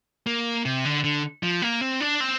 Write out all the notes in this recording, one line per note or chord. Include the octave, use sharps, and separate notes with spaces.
A#3
C3
D3
D3
F3
A#3
C4
D4
C4